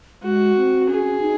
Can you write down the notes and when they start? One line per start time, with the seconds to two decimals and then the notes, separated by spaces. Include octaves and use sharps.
0.23 G#3 F#4
0.56 C4
0.88 C#4 G#4
1.21 D#4